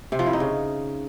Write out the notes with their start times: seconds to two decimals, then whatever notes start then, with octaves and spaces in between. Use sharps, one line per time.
0.12 C3
0.19 F3
0.26 E4
0.33 D#4
0.40 C#3